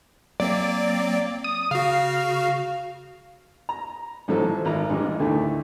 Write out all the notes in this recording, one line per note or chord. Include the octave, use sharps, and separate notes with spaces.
F#3 A#3 C4 D5
D#6
C#3 F#4 F5
A#5
A1 G#2 F3 F#3 A4
F3
G#1 A#5
A1 G2 G#3
D2 A2 D3 D#3 A3